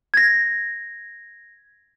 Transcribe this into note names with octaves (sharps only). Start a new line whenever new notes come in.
G#6 A#6